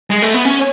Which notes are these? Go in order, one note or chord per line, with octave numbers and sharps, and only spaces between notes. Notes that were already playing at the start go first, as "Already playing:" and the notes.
G#3
A3
B3
C#4